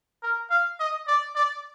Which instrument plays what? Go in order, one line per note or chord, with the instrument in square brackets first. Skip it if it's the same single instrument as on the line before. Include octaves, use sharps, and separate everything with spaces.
[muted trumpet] A#4
F5
D#5
D5
D5